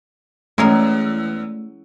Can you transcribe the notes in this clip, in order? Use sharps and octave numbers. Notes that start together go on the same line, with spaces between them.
E2 G#3 A3 C#4 A#4